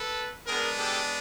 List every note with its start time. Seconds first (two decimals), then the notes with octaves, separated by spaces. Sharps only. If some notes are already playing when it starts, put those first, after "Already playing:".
Already playing: A4 B4
0.46 G#3 B3 D4 G#4 A#4
0.78 G4 A4